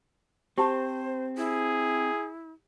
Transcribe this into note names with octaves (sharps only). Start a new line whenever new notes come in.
C4 G4 C5 A5 A#5
E4 G#4